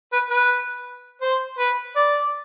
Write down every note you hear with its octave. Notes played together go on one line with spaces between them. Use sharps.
B4
B4
C5
B4
D5